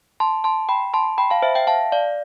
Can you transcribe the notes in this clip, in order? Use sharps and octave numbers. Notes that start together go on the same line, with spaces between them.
A5 C6
A5 C6
G5 B5
A5 C6
G5 B5
F5 A5
C5 E5
E5 G5
F5 A5
D5 F5